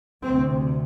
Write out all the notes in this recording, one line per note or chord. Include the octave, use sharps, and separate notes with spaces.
D2 C3 C4